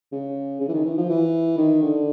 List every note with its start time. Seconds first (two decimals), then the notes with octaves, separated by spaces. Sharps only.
0.12 C#3
0.61 C#3
0.68 E3
0.73 D#3
0.85 E3
0.98 F3
1.09 E3
1.58 D#3
1.82 D3